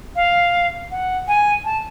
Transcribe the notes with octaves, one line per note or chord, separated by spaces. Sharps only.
F5
F#5
G#5
A5